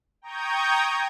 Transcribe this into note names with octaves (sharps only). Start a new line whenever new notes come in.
G5 A#5 C#6 D#6 G6 G#6